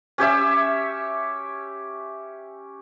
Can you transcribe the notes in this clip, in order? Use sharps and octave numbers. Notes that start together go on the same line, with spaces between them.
C#4 G4 C#5 E5